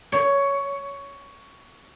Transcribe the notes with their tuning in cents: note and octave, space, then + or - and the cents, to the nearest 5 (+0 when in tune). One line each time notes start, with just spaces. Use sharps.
C#5 +10